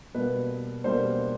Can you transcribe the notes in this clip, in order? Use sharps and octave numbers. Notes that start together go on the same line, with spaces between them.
B2 G3 A#3 B4
B2 G3 A#3 C5